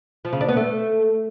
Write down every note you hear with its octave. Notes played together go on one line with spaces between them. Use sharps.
F3
C#3
D4
B3
A3